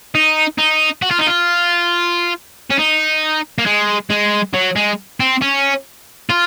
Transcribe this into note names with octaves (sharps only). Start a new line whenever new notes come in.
D#4
D#4
F#4
F4
D#4
F4
C#4
D#4
A#3
G#3
G#3
F#3
G#3
C4
C#4
F4